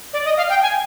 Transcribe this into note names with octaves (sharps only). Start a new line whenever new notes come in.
D5
D#5
F5
G5
G#5